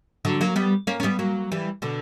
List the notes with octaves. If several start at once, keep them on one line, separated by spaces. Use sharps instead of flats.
D3 F#3
F#3 A#3
G3 B3
A#3 C#4
C#4
G3 B3
F#3 A#3
E3 G3
B2 D3